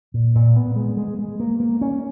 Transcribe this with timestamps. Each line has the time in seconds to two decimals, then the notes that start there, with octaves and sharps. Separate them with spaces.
0.14 A#2
0.35 A#2
0.56 B3
0.76 G#3
0.97 G#3
1.19 G#3
1.40 A#3
1.60 A#3
1.81 C#4